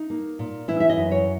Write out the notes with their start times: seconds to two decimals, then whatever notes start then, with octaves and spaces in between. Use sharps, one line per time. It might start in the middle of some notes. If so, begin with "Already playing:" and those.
Already playing: D#4
0.10 A#3
0.39 A#2
0.68 E3 E4
0.80 E5
0.89 D#5
0.97 F#2
1.11 C#5